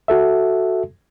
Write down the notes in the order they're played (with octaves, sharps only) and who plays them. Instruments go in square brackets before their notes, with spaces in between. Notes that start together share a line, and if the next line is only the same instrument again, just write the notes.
[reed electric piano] F#4 A4 E5